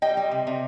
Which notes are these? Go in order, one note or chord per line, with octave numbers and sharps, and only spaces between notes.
G3 D#5 G5
G3
C3
C3